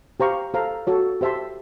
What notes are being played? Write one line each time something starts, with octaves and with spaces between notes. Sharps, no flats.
G4 C5 F5 A#5 C#6
A4 C5 F5 A#5
F#4 A4 C#5
G4 C5 E5 A5 C6